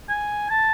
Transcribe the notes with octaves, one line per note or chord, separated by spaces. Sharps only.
G#5
A5